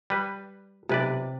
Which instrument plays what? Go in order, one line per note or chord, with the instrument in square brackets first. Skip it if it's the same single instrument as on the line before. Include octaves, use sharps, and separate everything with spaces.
[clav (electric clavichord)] G3 B4
[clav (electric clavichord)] B1 B4 D5 [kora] C3